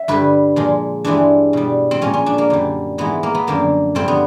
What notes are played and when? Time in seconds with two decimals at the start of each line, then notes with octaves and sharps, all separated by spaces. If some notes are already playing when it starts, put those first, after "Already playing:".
Already playing: E5
0.08 G2 D3 G3 B4
0.56 A#2 F3 G#3
1.05 G2 E3 G#3 D4
1.53 B2 G3
1.91 C4
2.01 A#2 F3 G#3 C#4
2.13 C#4
2.26 D4
2.38 A#3
2.50 F#2 D3 G3
2.98 G#2 E3 G#3 B3
3.23 A#3
3.35 B3
3.47 F#2 D3 F3 A#3
3.95 G2 D3 F3 C4
4.08 B3